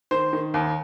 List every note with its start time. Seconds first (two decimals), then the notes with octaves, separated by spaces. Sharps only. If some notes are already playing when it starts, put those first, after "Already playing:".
0.11 D#3 C5
0.33 D#3
0.54 D#2